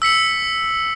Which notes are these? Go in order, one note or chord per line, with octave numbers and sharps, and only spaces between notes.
E6 B6 C#7 F#7